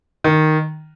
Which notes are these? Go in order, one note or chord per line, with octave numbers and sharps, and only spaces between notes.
D#3